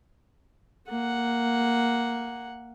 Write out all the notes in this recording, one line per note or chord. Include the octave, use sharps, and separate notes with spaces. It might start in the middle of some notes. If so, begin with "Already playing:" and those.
A#3 F#5